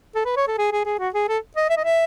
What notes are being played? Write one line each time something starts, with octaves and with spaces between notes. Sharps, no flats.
A4
B4
C#5
A4
G#4
G#4
G#4
F#4
G#4
A4
D#5
E5
D#5
E5